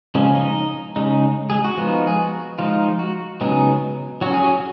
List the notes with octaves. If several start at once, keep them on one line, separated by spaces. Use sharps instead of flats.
C#3 F3 G#3 C#4
D#4 D#5
C#3 G#3 D#4
G#3 G#4
F#4
F3 G#3 B3 D#4
G#4
F#4
F3 G#3 D#4 F4
F#4
C#3 F#3 G#3 B3 D#4 G#4
F#3 C#4 F#4
G#4
F#4